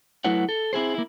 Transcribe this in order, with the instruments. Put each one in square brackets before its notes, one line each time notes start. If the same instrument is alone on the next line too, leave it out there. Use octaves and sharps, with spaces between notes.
[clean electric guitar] F#3 A3 E4 B4 C#5 F#5
A4
C4 E4 G#4 C5
A#3 E4